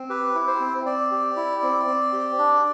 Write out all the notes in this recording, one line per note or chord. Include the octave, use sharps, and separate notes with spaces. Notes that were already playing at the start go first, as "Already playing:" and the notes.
Already playing: C4
G4 B4
E4
C5
C4
C4 D5
G4
E4
C4
C4
G4
D4